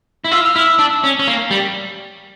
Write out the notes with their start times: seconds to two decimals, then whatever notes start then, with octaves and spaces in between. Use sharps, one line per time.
0.24 E4
0.31 F4 E6
0.45 F6
0.56 E4
0.59 E6
0.79 D4
1.04 C#4
1.19 C#4
1.28 A#3
1.51 G3